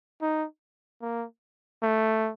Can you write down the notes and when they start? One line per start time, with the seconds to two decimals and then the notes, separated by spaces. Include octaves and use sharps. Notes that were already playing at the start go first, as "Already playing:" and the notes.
0.22 D#4
1.02 A#3
1.83 A3